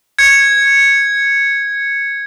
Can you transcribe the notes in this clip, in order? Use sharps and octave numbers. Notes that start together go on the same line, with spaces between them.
G#6 C#7